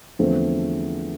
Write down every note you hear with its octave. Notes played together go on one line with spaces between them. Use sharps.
E2 D3 F3 A3 C4